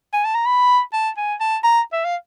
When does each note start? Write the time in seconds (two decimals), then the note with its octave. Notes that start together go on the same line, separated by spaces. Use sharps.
0.13 G#5
0.25 A5
0.35 A#5
0.46 B5
0.93 A5
1.17 G#5
1.40 A5
1.64 A#5
1.92 E5
2.05 F5